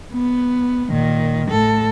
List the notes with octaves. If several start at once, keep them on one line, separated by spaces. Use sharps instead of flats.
B3
A#2 D#3
A2 A4